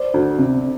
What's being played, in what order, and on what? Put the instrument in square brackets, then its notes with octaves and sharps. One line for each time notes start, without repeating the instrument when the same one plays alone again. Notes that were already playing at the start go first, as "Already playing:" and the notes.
Already playing: [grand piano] C5 D5
[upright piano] D2
C3